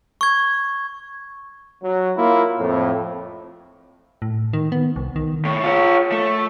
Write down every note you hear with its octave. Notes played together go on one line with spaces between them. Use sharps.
C#6 G#6
F#3
A#3 E4 F4
F2 A2
A2
D#3
B3
C2
D#3
A2
F4 C#5
A3